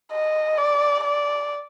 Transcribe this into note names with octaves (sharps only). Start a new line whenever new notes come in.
D#5
D5
D5